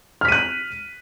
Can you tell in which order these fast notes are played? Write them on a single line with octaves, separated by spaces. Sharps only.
F6 B6 D#7 F#6